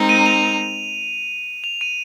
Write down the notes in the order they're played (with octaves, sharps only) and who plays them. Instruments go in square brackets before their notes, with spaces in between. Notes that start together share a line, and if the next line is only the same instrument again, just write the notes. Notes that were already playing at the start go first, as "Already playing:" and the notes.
Already playing: [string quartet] G#3 C4 D#4 A#4
[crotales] D#7
F7
F7
D#7